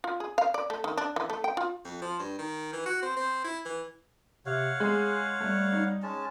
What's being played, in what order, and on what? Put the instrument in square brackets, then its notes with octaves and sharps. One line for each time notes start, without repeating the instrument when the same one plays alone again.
[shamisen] F4
G#4
F5
D5
A3
D#3
D4
E3
A3
G5
F4
[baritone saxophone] F2
F3
G2
D#3
E3
F#4
C4
C4
E4
E3
[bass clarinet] C3 [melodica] C#5 F5 F#5
[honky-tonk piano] G#3 [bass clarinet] G#4
[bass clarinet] G3 [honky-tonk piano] A3
[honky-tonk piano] D#4
[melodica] G#3 C#4 A5